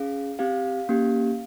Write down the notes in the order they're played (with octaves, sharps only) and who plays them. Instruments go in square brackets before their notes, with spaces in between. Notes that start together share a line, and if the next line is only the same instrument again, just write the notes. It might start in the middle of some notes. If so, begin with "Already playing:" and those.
Already playing: [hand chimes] C#4 G#4 F5
C4 G4 F5
A#3 C#4 G4